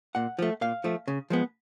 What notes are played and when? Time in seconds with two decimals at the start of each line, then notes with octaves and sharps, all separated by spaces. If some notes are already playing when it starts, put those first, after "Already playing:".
0.15 A#2 F#5
0.39 F3 A3
0.61 A#2 F5
0.84 F3 A3
1.08 C#3
1.30 F3 G#3 B3